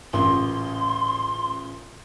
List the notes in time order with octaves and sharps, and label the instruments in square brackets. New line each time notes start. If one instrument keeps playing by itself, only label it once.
[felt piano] A1 A#2 C#3 [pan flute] C6